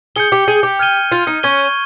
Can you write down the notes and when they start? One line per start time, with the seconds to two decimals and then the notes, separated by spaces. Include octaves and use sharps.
0.16 G#4 G6 C#7 G7
0.32 G4
0.48 G#4
0.63 G4
0.79 F6 G#6 D#7 G7
1.12 F4
1.27 D#4
1.43 C#4 C#6 G#6 D#7 G7